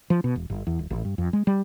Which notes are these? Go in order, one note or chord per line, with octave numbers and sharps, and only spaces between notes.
F3
B2
E1
G1
E2
D#1
A1
G2
F2
G#3
G3